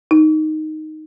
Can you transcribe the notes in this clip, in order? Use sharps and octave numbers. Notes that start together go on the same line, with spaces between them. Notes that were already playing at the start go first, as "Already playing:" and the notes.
D#4